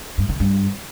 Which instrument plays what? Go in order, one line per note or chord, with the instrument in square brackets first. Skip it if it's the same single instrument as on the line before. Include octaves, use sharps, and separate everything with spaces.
[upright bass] G2
D#3
G2